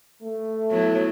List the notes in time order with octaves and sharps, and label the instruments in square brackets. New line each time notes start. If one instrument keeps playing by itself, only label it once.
[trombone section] A3
[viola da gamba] F#3 B3 E4